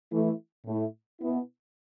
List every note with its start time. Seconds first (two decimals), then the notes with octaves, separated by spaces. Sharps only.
0.12 E3 A3 E4
0.66 A2 A3 E4
1.20 B2 B3 E4